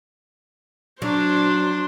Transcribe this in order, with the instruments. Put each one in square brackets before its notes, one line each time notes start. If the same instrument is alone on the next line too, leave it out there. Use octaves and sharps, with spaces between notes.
[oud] F#3 [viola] D4 C5